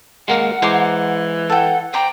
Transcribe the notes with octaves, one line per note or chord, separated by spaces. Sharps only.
G#3 A#3 A#4 F#5
E3 G#3 C5 A#5 D6
A4 F#5 G5
C5 D5 G5 A#5